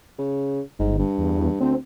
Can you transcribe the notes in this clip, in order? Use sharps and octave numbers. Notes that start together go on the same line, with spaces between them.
C#3
G1 G#2
G2
E2
D2 C4